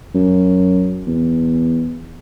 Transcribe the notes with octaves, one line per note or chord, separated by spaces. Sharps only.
F#2
E2